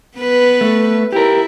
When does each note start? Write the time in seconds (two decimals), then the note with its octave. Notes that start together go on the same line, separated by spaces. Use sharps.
0.18 B3 B4
0.61 A3
1.12 E4 G4 A#4